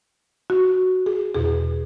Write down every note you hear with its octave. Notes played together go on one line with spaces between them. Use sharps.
F#4
G#4
E2 B2 G#4